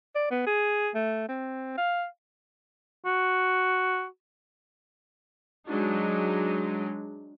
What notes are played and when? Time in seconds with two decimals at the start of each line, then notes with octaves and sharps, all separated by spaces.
0.15 D5
0.31 B3
0.47 G#4
0.95 A3
1.29 C4
1.78 F5
3.06 F#4
5.69 F#3 G#3 D4 D#4